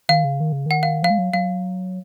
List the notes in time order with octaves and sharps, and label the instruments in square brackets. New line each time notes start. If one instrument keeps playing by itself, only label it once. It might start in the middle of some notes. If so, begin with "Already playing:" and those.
[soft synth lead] D#3 [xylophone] F5
[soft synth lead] C#3
D#3
C#3
[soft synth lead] D#3 [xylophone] F#5
[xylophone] F5
[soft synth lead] F3 [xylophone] F5
[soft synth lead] G#3
F#3
[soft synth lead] F#3 [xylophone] F5